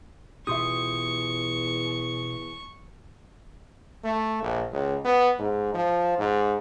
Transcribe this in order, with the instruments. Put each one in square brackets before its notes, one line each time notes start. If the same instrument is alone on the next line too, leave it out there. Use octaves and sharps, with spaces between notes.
[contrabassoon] E2 [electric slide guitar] B2 F4 G4 [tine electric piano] E5 C6 D#6 [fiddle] C#6
[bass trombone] A3
A#1
C#2
B3
G#2
F3
G#2